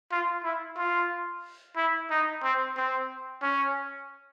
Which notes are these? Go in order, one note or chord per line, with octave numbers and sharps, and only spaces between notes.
F4
E4
F4
E4
D#4
C4
C4
C#4